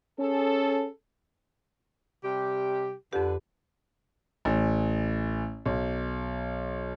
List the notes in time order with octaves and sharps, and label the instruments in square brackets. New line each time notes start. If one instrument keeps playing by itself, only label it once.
[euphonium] C#4 [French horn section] G#4 A4
[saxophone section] C3 G3 G4
[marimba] F2 G4 [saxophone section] D3 B4
[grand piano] A1
B1